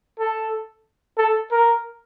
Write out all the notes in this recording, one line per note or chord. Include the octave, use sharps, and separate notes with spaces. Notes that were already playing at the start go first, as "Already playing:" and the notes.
A4
A4
A#4